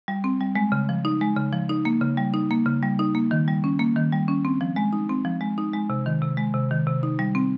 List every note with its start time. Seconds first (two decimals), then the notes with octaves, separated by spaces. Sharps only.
0.08 G3
0.24 C4
0.40 G3
0.55 G#3
0.72 C#3
0.89 F3
1.05 D#4
1.21 G#3
1.36 C#3
1.53 F3
1.69 D#4
1.85 A#3
2.01 C#3
2.17 G3
2.34 D#4
2.51 A#3
2.66 C#3
2.82 G3
2.99 D#4
3.15 A#3
3.31 D#3
3.48 G3
3.64 C#4
3.79 A#3
3.96 D#3
4.12 G3
4.28 C#4
4.45 C4
4.61 F3
4.76 G#3
4.93 D#4
5.09 C4
5.25 F3
5.41 G#3
5.58 D#4
5.74 G#3
5.90 C3
6.06 D#3
6.21 C3
6.37 G#3
6.54 C3
6.71 D#3
6.87 C3
7.03 D#4
7.19 G3
7.35 C4